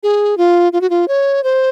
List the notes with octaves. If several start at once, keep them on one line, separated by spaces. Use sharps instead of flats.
G#4
F4
F4
F#4
F4
C#5
C5